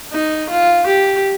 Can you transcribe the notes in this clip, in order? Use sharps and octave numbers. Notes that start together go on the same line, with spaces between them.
D#4
F4
G4